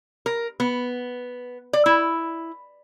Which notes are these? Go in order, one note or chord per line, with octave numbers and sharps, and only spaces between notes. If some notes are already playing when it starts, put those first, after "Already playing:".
A#4
B3
D5
E4